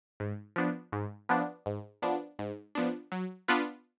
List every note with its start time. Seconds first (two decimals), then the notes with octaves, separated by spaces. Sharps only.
0.20 G#2
0.56 F3 B3 D4
0.92 G#2
1.29 F3 B3 D4
1.66 G#2
2.02 F3 B3 D4
2.39 G#2
2.75 F3 B3 D4
3.12 F#3
3.48 B3 D4 F4 B4